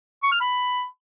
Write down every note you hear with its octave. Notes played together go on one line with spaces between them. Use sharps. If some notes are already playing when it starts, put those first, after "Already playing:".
C#6
F6
B5